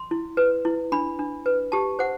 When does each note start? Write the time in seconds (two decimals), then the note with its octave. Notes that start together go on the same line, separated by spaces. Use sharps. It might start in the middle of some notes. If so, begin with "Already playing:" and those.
Already playing: C6
0.11 E4
0.37 B4
0.65 E4
0.92 D4 B5
1.19 D4
1.46 B4
1.72 G4 A5
1.99 C5 F#5